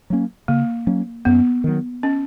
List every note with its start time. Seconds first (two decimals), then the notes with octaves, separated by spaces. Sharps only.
0.10 F#3 A#3 C#4
0.48 C#3 A#3
0.87 F#3 A#3 C#4
1.25 F#2 B3
1.64 D#3 F#3
2.03 C#4